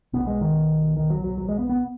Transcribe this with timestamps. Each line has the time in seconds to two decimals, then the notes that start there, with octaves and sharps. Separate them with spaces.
0.13 B1 B2 B3
0.27 G#3
0.41 D#3
0.97 D#3
1.10 F#3
1.24 F#3
1.38 F#3
1.48 G#3
1.59 B3
1.69 B3